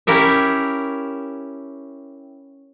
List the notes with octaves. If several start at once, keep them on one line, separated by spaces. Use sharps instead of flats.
C#4 E4 G4 A#4 E5